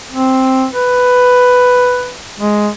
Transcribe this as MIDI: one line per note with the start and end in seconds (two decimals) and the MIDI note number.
0.12 0.66 60
0.71 2.15 71
2.39 2.69 56